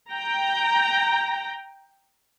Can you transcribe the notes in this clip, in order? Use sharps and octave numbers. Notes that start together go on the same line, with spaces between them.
G5 A#5